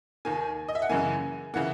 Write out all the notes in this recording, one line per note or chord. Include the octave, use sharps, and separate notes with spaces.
D#2 D#3 A#3 G#5
D#5
E5
F#5
F#2 C#3 E3 A#3 G#5
C#3 E3 A#3 F#5